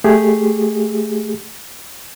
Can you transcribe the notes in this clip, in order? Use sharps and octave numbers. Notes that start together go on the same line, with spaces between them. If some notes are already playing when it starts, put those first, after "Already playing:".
A3 G4 G#4